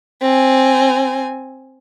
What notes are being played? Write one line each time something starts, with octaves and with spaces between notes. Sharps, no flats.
C4 G#5